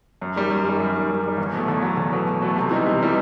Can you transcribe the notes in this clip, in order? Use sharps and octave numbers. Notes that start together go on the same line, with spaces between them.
F#2
D#3 G3
F#2
D#3 G3
F#2
D#3 G3
F#2
D#3 G3
E2
B2 F#3 A3
E2
B2 F#3 A3
E2
B2 F#3 A3
E2
B2 F#3 A3
C3
E3 G3 D#4
C3
E3 G3 D#4